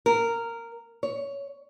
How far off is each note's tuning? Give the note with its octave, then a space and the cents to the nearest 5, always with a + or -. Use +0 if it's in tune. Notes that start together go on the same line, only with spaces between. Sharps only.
A#4 -10
C#5 +15